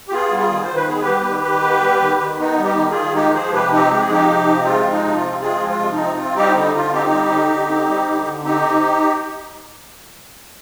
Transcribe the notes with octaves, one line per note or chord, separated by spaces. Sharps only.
G4
B3 F4 G#4
G3
F4 G#4
D#3
C5
D#3
B4
B3 G#4
G4 B4
G3
D#3
D#3
B3
G3
D#3
D#3
B3 D#4
G3
D#4 G4
D#3
F4 G#4
D#3
G#3 D#4 G4
F3 G#4 C5
C3 G4 B4
C4 D#4 G4
G#3 G4
G#4
F3 D#4 G4
C3
C4
D#4
G#3 F4
F3
D#4
C3
F4
C4
G#3 F4 G#4
F3
F4
C3
D#4
C4
C4 F4
G3 D#4 G4
D3 D#4
D3 F4
C4 D#4 G4
G3
D3
D3
C4
G3
D3
D3
C4 D#4 G4